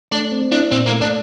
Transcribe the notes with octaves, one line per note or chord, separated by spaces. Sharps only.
A3 D4
C4
D4 E4
A#2 C4
A#3
A3
D4